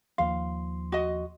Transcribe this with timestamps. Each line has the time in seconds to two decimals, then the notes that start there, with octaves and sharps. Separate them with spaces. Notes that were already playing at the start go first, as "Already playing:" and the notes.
0.18 D#2 F3 F5 C6
0.92 F#4 D#5